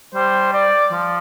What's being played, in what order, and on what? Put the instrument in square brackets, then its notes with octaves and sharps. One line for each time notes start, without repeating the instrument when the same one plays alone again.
[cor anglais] G3 [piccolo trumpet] C5
[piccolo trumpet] D5
[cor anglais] F3